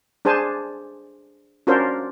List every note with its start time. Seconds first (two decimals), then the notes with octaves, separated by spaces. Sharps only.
0.25 D4 G#4 C5 G#5 A5
1.67 C#4 D4 F4 F#4 A#4 C5